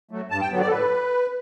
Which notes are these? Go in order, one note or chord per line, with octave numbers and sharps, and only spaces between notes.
F#3 A3
G2 A5
G5
D3 F#3 B3
D5
A4
A2 B4